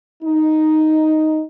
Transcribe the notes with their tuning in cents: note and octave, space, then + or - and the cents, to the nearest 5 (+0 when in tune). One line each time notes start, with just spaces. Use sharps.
D#4 +0